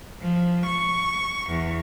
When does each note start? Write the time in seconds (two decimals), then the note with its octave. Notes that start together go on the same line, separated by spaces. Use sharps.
0.21 F3
0.65 C#6
1.48 E2